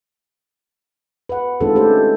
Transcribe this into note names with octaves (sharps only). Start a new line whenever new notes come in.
B4 F#5
D#3 G#3 C4 D4 F4 A4
A3 C#4 G4 A4 C5